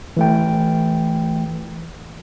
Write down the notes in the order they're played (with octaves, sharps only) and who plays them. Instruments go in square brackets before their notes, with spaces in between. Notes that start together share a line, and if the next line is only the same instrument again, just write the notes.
[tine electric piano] E3 A3 G5